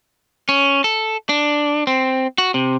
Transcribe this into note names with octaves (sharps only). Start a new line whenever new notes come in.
C#4
A4
D4
C4
F#4
C3